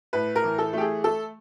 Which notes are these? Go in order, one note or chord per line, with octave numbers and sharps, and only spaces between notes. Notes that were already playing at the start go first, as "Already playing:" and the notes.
A2 B4
A#4
E3
A4
A3 G4
G#4
A3 A4